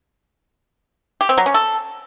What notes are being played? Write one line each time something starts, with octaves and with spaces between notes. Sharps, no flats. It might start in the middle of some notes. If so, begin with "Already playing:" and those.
G4
C4
F#3
C#4
A4